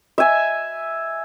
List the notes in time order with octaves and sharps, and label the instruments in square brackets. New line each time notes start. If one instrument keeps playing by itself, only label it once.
[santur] E5 G#5